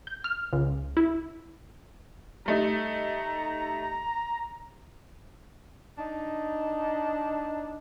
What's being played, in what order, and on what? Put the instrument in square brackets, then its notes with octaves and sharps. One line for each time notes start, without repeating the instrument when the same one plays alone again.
[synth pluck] G6
F6
C#2
E4
[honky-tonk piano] G3 A3 D#4 [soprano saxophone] A#5
[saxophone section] D4 D#4